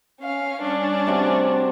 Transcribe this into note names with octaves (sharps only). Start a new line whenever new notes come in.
C#4 F5
G3 C#4 D4
C3 F#4